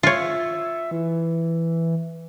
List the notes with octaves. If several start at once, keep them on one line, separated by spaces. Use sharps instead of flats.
F4 C#5 E5
E3